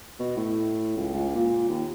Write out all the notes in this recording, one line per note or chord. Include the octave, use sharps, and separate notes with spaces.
B2
A2
C#2
C#2
A#2
D#2